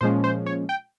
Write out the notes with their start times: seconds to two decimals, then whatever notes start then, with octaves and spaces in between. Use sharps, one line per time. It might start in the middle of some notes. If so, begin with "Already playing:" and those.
0.01 A#2 F3 G#3 C#4 C5
0.24 C5
0.46 C#5
0.69 G5